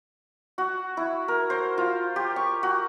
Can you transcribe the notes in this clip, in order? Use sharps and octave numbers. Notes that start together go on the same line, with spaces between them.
F#4
E4
A#4
C5
F4
G4
C#6
F#4